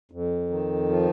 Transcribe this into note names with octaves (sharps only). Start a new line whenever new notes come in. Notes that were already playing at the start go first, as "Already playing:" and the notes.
F2
D#3
F3